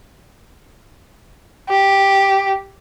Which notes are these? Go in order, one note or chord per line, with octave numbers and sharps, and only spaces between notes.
G4